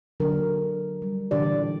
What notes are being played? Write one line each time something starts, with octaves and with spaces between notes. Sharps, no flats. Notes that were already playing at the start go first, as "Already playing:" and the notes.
D3 F#3 D4 A#4
G3
A#2 D3 E3 D4 G4 D5